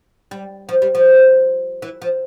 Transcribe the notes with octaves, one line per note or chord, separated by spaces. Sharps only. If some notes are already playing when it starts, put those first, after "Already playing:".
G3
F3
G3
F3
E3
F3